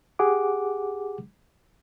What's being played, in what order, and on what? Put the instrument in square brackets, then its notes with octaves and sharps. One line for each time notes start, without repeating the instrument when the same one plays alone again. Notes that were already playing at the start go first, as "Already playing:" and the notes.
[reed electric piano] G4 G#4 F#5 D6